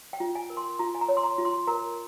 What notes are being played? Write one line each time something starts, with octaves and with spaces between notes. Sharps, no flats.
G5
F4
G#5
A#4
C6
F4 A#5
G#5
A#5
C#5
C6
A#5
F4
C6
A#4 A#5